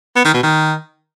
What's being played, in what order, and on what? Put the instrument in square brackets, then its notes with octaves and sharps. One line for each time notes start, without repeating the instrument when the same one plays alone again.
[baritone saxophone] B3
D#3
B2
D#3